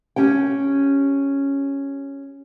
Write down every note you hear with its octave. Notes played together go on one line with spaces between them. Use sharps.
C#4 G4 G5